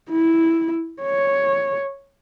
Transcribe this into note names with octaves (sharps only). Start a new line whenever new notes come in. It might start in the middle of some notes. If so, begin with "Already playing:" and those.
E4
C#5